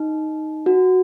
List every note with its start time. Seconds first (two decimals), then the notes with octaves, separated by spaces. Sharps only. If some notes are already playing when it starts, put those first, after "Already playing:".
Already playing: D#4
0.66 F#4